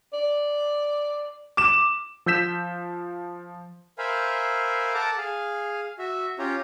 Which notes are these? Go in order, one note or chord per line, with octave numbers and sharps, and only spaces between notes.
D5
D6 E7
F3 E6 G6 B6 E7
A#4 C5 E5 F5 G#5 B5
A4 F#5 A5 A#5 D6
G#4 F5
F#4 E5
C#4 F4 G4 C#5 A#5